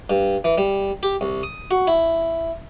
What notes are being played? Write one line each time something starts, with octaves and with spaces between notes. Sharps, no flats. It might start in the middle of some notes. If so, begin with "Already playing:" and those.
G2
E3
G3
G4
C2
D#6
F#4
E4